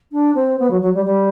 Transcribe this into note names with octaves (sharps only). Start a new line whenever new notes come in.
D4
C4
B3
F#3
F#3
G3
G3